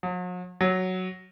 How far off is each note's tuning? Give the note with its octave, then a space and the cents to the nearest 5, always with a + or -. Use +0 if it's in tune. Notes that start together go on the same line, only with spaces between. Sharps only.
F#3 -45
F#3 +0